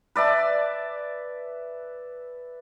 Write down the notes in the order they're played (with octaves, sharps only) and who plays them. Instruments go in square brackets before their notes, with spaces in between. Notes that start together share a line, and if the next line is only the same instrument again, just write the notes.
[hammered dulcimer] B4 D5 E5 A5